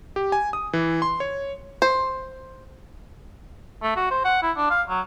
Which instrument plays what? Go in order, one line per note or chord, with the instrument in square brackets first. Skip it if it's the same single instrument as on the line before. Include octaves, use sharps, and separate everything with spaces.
[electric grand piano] G4
G#5
D#6
E3
C6
C#5
[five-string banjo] C5
[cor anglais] A3
F#4
C5
F#5
E4
D4
F5
F#3